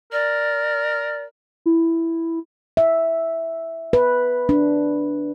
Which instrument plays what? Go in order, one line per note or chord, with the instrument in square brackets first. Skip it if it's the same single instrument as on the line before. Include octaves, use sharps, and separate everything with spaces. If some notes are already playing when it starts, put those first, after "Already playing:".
[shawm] A#4 [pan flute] D5
[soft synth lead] E4
[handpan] E5
B4
D4